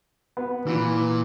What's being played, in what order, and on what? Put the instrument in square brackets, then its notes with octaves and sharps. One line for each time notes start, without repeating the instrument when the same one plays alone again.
[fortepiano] B3
[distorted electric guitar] A#2 [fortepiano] E3